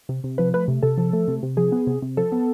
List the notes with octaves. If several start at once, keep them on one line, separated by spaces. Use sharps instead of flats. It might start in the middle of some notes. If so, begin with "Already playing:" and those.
C3
C3
F3 B4
A3 B4
C3
C3 A4
F3
A3
C3
C3
F3 G#4
B3
C3
C3
F3 A4
B3